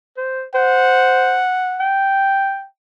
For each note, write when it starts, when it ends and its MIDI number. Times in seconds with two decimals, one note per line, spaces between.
0.17 0.43 72
0.55 1.43 72
0.55 1.93 78
1.80 2.64 79